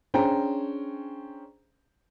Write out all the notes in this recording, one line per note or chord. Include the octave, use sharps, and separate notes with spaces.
C#4 D4 G#4 C5 G5 A#5